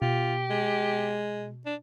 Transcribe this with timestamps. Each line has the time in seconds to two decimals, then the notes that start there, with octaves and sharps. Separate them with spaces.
0.02 B2 F4 G4
0.50 G#3
1.66 D4